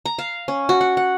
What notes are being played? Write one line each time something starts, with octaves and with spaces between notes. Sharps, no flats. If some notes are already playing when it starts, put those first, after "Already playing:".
A#5
F5
C#4
F#4
F#5
F#5